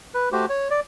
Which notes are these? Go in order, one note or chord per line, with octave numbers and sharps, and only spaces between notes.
B4
A3 F#4 G4 C5
C#5
D5